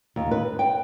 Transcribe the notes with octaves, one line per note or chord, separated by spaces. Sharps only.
D#2
B4
G5